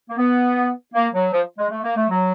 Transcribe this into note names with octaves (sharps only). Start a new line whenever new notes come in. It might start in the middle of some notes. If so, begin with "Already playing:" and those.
A#3
B3
A#3
F#3
F3
G#3
A3
A#3
A3
F#3